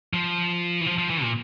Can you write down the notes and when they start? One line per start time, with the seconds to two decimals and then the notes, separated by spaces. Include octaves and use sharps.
0.13 F3
0.81 E3
0.86 F3
0.98 F3
1.10 E3
1.23 A#2